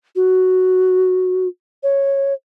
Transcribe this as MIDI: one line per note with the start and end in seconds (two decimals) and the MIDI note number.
0.16 1.48 66
1.83 2.34 73